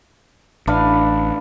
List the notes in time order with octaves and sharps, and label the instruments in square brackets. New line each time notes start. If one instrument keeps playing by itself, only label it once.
[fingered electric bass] A1 [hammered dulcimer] D4 B4 F5